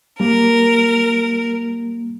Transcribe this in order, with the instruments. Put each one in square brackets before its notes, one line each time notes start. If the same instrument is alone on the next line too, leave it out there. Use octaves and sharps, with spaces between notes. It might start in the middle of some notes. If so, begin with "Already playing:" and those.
[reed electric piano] G3 A#3 [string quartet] A#4